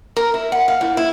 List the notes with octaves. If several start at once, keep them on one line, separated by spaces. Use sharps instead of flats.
A#4
E4
F#5
F5
A2
E4